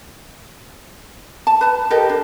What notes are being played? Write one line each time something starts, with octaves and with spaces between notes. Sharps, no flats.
A5
B4 A5
G4 A4 A#4 D#5
D4